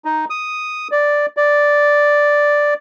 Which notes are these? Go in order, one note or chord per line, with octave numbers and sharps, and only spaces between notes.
D#4
D#6
D5
D5